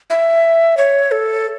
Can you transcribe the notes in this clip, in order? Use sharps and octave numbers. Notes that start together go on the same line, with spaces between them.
E5
C#5
A4